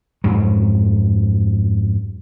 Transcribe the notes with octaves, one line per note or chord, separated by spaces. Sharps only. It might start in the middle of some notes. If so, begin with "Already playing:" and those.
F2 G#2 F#3